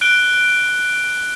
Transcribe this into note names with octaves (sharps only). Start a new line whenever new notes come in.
F#6 D7 G7